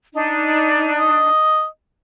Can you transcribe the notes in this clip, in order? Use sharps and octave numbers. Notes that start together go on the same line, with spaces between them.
D4 D#4
D#5